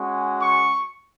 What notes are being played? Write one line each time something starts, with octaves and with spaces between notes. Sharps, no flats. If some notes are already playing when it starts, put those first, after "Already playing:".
Already playing: G#3 C#4 F#4
C#6